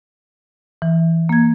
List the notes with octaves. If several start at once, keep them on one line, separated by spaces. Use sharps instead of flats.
E3
A#3 G#6